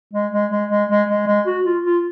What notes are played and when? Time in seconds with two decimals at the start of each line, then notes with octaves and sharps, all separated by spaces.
0.13 G#3
0.32 G#3
0.51 G#3
0.70 G#3
0.89 G#3
1.09 G#3
1.27 G#3
1.46 F#4
1.65 F4
1.84 F4